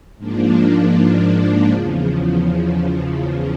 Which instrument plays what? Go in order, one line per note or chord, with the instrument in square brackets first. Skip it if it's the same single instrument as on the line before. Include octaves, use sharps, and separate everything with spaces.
[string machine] G#2 F3 A#3 D4
E2 C#3 F3